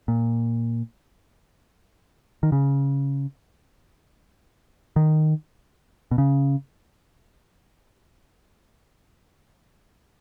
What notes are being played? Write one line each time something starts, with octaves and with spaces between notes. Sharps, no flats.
A#2
D#3
C#3
D#3
B2
C#3